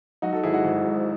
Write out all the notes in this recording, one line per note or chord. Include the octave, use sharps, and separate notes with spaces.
F#3 D#4 F#4
F#4 A4
G#1 E4 G#4
D#4 F#4
G#1
G#2